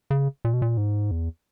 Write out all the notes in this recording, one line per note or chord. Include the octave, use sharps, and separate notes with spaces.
C#3
A#2
B2
A#2
G#2
E2